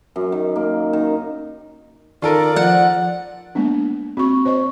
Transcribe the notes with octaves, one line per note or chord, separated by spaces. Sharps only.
F#2
D#3
A#3
D#3
D#3 F4 A4 A#4 D5
F3 F#5
G#3 A#3 B3 D4
C4 F#4 C#6
C5 C#5 D#5 C#6